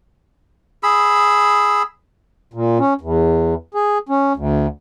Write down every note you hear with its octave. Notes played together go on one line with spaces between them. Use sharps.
G#4 B5 E6
A#2
C#4
E2
G#4
C#4
D2